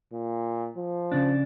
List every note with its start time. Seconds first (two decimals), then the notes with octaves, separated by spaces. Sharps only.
0.13 A#2
0.77 F3
1.12 C#3 D4